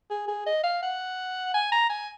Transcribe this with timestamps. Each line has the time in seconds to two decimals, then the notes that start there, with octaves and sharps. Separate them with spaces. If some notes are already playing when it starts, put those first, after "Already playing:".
0.10 G#4
0.28 G#4
0.46 D#5
0.63 F5
0.82 F#5
1.54 G#5
1.72 A#5
1.89 G#5